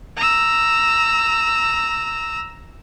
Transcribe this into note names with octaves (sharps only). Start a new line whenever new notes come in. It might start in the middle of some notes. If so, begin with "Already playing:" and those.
A#5 E6